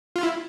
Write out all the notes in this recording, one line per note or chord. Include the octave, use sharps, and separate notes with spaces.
F4
E4